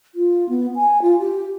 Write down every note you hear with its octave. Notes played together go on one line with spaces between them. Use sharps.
F4
B3
G#5
F4
G4